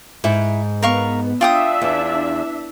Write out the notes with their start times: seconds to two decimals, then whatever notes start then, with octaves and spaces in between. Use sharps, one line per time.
0.24 G#2 E4
0.82 B3 A#4 F5 C#6
1.41 D4 F4 E5 G5 D#6
1.82 E2